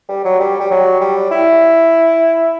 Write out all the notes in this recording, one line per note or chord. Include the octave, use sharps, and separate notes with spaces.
G3
F#3
G3
G3
F#3
G3
E4